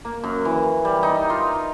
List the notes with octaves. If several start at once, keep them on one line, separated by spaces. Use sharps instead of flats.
A#3
F#2
E3
G3
D#4
F4